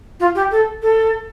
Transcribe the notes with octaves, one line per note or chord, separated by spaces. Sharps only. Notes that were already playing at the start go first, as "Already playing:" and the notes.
F4
G4
A4
A4